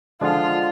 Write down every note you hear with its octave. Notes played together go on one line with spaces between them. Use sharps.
D3 F3 G#3 D4 F4